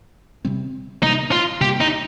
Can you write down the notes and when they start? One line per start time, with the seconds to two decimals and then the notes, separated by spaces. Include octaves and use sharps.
0.45 C3 G3 C4
1.02 C3 G3 A#3 D#4
1.32 F4
1.61 C3 G3 A#3 G4
1.81 D#4